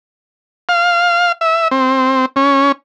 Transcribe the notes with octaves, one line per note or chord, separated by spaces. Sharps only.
F5
E5
C4
C#4